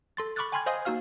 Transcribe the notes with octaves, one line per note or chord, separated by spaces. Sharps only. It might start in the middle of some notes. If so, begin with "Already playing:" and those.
A4 C6 A6
B5 C#6 D6 F6 F#6 A6
G5 G#5 B5 C6 F6 G#6
C5 D#5 F5 G#5 C6 D#6
A#3 D#4 F#4 F5 F6